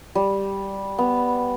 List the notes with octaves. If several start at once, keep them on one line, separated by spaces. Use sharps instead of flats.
G3
B3